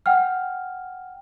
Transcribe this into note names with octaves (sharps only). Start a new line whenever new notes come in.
F#5 G5 F6